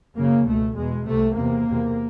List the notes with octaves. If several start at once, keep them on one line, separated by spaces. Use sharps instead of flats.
F#2 C#3 A#3
C#2 B2 A3
E2 B2 G#3
C2 C3 A3
E2 C3 A#3
E2 C3